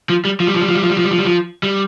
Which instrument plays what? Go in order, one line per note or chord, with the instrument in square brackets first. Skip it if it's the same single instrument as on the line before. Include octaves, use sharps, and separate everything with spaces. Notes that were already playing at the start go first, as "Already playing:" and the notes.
[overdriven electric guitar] F3
G3
F3
G3
F3
G3
F3
G3
F3
G3
F3
G3
F3
G3
F3
G3